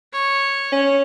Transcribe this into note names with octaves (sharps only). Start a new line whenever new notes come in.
C#5
C#4